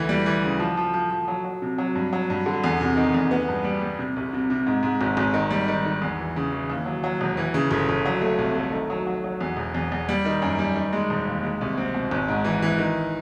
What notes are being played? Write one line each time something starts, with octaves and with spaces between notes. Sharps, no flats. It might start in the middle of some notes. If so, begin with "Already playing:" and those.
Already playing: D2 E3
G3
E3
C#3
F3
F3
F3
F3
F#3
F#3
C3
F#3
G2
F#3
G2
D3
E2
C3
D#3
E2
B3
G2
G3
G3
C3
C2
C3
C3
G#2
G#2
G#1
G#1
D#3
G3
D#3
D#3
E2
E3
C#3
E3
D#2
F#3
F#3
E1
E3
C#3
G1
G1
F#3
A3
C2
A3
D#3
F#3
F#3
F#3
E2
E1
E2
E2
G3
D#3
F#2
G3
D#3
G#3
E1
D#2
G#3
C2
C4
B2
G#1
G#2
E3
E3
D#3